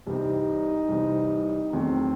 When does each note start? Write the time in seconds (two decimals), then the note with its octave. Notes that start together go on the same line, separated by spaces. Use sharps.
0.06 C2 C3 E3 G3 C4 D#4
0.88 C2 C3 E3 G3 C4
1.72 E2 D#3 F#3 A3 C4